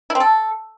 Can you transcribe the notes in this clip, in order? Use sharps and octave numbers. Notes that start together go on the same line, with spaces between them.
E4
C4
A4